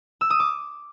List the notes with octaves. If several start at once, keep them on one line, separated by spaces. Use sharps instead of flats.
E6
D#6
D6